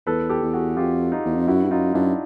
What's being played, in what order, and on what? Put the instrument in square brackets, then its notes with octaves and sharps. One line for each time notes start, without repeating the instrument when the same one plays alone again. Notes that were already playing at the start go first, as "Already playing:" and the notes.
[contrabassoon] E2 [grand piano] A4 B4
[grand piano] G4 A4
[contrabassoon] E2
[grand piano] F#4 G#4
[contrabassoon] F2 [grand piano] F4 G4
[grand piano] D#4 F4
[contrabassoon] E2
F2
[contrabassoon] F#2 [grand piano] E4 F#4
[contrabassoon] G2
[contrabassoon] F#2 [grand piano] D#4 F4
[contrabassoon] F#2 [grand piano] D4 E4